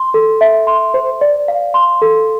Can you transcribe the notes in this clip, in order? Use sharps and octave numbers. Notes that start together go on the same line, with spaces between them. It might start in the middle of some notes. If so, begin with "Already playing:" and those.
Already playing: C6
A4
E5
C6
C5
D5
F5
C6
A4